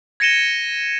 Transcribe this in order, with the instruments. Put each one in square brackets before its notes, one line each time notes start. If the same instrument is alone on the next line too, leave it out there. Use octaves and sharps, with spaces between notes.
[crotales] G#6 A#6 C#7 D#7 E7 G7